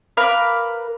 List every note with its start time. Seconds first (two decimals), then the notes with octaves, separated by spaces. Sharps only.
0.17 A#4 B4 F5 D6